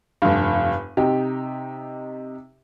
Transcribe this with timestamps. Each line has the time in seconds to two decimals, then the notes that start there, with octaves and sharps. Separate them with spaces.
0.22 F1 G2
0.97 C3 D#4 G4